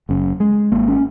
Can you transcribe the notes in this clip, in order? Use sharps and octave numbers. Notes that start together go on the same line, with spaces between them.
F#1 F#2 C#3
G#3
G#1 G#2 A#3
C#4